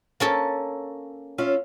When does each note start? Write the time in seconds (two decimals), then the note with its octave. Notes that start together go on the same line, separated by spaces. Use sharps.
0.20 A#3 C#4 A4
1.38 C#4 F4 E5